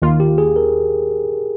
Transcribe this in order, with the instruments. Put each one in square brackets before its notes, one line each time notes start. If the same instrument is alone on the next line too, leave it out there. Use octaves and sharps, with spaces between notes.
[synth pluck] D#2 D#3 A#3 F4
[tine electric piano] G4
G#4
A#4